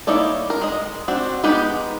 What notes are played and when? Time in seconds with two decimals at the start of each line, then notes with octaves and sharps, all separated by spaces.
0.07 A#3 D#4 E4 C#5 D5
0.50 A#4
0.61 G#3 D#5
1.08 C4 D4 F#4
1.44 G#3 B3 D#4 G4